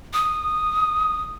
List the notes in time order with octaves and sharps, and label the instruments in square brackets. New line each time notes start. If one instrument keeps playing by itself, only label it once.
[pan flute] D#6